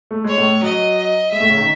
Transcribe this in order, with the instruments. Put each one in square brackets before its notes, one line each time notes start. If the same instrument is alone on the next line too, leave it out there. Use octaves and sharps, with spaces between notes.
[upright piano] A3
[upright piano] G#3 [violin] C#5
[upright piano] A2 A3
[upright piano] F#3 [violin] D#5
[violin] D#5
[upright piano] G#3 [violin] E5
[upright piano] A2 A3
C#3 C#4
D#3 D#4